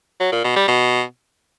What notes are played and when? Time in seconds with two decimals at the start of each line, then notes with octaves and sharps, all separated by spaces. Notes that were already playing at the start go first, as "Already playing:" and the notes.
0.21 F#3
0.32 A#2
0.44 B2
0.56 G3
0.68 B2